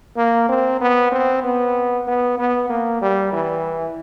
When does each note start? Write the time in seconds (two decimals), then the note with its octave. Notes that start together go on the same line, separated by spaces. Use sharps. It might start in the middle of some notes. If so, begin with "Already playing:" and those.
0.17 A#3
0.49 C4
0.81 B3
1.12 C4
1.43 B3
2.07 B3
2.38 B3
2.69 A#3
3.02 G3
3.33 E3